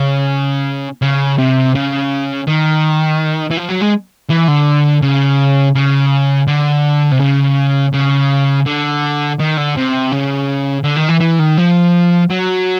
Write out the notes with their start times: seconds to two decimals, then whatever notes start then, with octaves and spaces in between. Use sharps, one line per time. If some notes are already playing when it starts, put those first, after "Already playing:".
Already playing: C#3
1.02 C#3
1.38 C3
1.75 C#3
2.47 D#3
3.51 E3
3.57 F3
3.69 F#3
3.81 G#3
4.30 E3
4.48 D3
5.03 C#3
5.75 C#3
6.48 D3
7.12 C3
7.20 C#3
7.94 C#3
8.66 D3
9.39 D#3
9.57 D3
9.76 C3
10.11 C#3
10.84 D3
10.97 D#3
11.09 E3
11.21 E3
11.40 D#3
11.58 F3
12.30 F#3